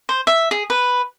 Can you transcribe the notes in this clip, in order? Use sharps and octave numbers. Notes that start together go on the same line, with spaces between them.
C5
E5
G#4
B4